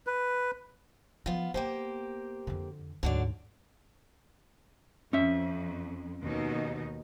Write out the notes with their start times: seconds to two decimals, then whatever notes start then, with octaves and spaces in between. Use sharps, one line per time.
0.07 B4
1.26 F3 B3 F4
1.54 A#3 B3 G4 C5
2.47 F2 D3
3.03 D2 G#2 D3 F#3 D5
5.13 F2 C#4 E5
6.23 D#2 B2 D#4